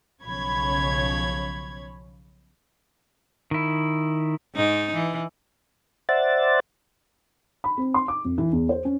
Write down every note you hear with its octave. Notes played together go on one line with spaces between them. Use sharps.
B1 C#3 F3 C#5 B5 G#6
D#3 E4
G#2 D#4
E3
C5 D5 E5 F#5 A6
B5
C4
C6
D6
F2
E3
E2
C5
C#4